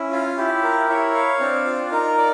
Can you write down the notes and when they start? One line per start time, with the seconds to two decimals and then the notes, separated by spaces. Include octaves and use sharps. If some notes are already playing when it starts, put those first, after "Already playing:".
Already playing: C#4 E4
0.12 F4
0.37 E4 G4
0.63 A#4
0.88 E4 C#5
1.15 F5
1.40 C4 D4
1.66 F4
1.92 D#4 A#4
2.18 D5